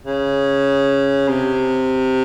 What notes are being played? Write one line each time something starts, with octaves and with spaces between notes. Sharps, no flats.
C#3
C3